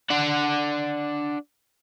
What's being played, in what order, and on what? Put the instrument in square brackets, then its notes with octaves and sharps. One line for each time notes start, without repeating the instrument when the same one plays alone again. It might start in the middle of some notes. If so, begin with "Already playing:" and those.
[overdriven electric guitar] D4 F#5